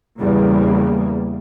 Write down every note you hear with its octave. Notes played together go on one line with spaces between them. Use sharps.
E2 C#3 G3 A#3